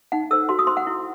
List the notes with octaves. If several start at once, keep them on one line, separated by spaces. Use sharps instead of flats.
D#4 F#5
A4 C5 E6
F#4 C6
D#6
C5 C6
F#5
E4